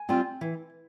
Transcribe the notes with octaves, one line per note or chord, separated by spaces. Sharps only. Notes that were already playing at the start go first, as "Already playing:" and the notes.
Already playing: G#5
G3 C4 F4
E3